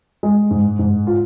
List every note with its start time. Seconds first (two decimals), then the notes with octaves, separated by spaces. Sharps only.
0.23 G#3
0.51 G#2
0.79 G#2
1.07 F4